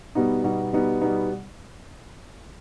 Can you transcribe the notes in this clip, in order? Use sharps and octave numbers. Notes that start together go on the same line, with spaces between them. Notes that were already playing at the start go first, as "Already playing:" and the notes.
B2 G3 B3 D#4
B2 G3 B3 D#4
B2 G3 B3 D#4
B2 G3 B3 D#4